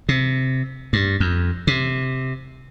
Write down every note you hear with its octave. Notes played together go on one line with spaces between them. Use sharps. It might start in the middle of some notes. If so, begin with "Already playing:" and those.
C3
G2
F2
C3